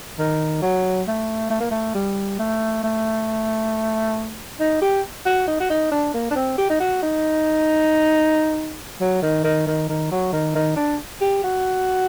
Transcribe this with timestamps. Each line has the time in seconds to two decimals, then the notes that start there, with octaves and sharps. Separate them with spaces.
0.19 D#3
0.62 F#3
1.07 A3
1.50 A3
1.60 A#3
1.71 A3
1.95 G3
2.39 A3
2.84 A3
4.60 D#4
4.82 G4
5.26 F#4
5.48 D#4
5.60 F#4
5.70 D#4
5.91 D4
6.14 A#3
6.31 D4
6.36 C4
6.58 G4
6.70 D#4
6.80 F#4
7.02 D#4
9.01 F#3
9.22 D#3
9.44 D#3
9.67 D#3
9.89 D#3
10.12 F#3
10.32 D#3
10.55 D#3
10.76 D4
11.21 G4
11.44 F#4